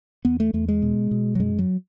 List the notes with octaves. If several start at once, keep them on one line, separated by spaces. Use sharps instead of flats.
E2 B3
A3
E2 A3
G#3
B2
B2
F#3
F#2 G#3
F#3